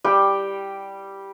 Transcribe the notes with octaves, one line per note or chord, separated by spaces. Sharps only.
G3 G5